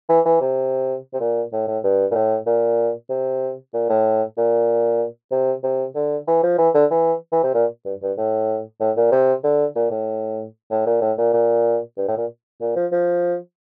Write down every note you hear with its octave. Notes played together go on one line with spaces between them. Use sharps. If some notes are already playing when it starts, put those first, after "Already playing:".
E3
E3
C3
C3
A#2
A2
A2
G2
A#2
A2
A#2
C3
A#2
A2
A#2
C3
C3
D3
E3
F3
E3
D3
E3
E3
C3
A#2
G2
G2
A2
A2
A#2
C3
D3
A#2
A2
A2
A#2
A2
A#2
A#2
G2
A2
A#2
A#2
F3
F3